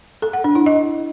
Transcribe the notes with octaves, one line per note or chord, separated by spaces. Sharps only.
A4
F#5
D4
E4
D#5